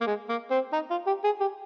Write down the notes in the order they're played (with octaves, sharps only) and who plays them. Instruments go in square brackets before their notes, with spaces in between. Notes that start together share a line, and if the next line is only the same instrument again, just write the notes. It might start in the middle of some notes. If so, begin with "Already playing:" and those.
[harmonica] A#3
G#3
A#3
C4
D#4
F4
G4
G#4
G4